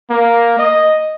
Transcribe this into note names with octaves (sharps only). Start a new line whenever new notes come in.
A#3
D#5